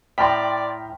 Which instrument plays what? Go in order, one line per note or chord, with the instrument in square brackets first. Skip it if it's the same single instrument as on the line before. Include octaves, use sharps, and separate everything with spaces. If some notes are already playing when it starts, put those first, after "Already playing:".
[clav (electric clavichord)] A2 [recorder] D5 [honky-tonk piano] G5 C6 [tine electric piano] A#5 F6 B6